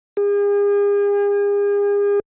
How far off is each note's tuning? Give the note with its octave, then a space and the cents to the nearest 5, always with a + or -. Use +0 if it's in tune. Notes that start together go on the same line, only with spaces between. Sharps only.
G#4 -40